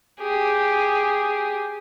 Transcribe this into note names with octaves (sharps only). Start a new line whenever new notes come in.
G4 G#4